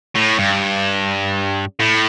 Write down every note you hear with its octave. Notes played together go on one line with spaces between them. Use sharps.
A2
G2
A2